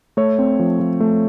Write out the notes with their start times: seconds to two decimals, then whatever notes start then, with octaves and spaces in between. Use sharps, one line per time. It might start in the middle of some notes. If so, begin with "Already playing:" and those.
0.17 A3 C#5
0.39 C4
0.59 F3
0.80 F3
1.00 A3